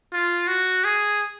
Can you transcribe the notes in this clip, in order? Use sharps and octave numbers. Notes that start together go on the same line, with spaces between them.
F4
F#4
G#4